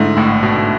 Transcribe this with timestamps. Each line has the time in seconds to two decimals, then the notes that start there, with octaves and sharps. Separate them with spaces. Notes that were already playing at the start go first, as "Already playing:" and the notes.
Already playing: G#2 D3 A3 E4
0.17 A1 A2
0.43 B2
0.57 A2